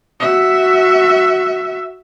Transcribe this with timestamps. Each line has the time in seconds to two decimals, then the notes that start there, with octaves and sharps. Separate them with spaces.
0.20 F#4 E5